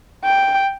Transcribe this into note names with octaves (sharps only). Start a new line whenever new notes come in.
G5